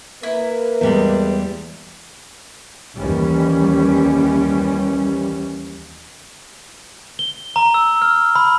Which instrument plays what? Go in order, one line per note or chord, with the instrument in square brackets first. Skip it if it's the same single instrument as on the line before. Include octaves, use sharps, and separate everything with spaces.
[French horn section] A#3 A#4 B4 [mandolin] E4
[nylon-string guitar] E2 G3 G#3
[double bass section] D#2 E3 G3 C#4
[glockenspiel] G7
A#5
E6
F6
B5